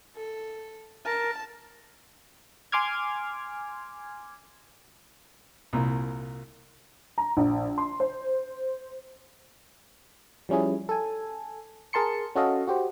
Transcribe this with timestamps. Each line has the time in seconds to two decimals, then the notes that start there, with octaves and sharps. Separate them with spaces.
0.16 A4
1.06 A#4 A5
2.72 G#5 C6 D6 F6 G#6
5.73 C2 A#2
7.18 A#5
7.37 A#1
7.78 C6
8.00 C5
10.49 F3 G3 C#4 E4 G#4
10.89 A4 G#5
11.93 G#4 A#4 A5 C6 C#7
12.35 C#4 F#4 A4 D#5 F5
12.68 F#4 G4 C5